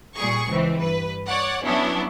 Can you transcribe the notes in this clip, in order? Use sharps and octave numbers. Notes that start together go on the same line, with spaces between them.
A#2 G3 G#4 C#6
C#2 E3 C4
G2 B4
C#5 D5 F#5
F#3 B3 C#4 D4 E4